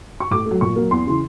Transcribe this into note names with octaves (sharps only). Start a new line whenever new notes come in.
C#6
A2 D6
A3
F#3
A#2 C#6
F#3 A#3
E2 C6
C#3 E3